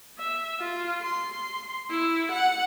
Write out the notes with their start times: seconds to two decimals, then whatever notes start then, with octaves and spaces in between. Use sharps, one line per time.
0.18 E5
0.59 F4
1.02 C6
1.90 E4
2.32 F#5